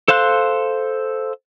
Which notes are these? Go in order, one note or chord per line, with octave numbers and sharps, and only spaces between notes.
A4 C5 F5 C6 F#6